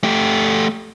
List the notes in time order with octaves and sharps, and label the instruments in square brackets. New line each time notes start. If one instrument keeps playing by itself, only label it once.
[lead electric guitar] A3 G4